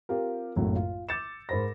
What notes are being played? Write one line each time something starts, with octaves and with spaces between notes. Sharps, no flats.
C4 F4 G4 A#4
F#1 B1 F#2 A2 F#3
F4
D6 E6 G6 A6 C#7 E7
G#2 A#4 C5 B5 A#6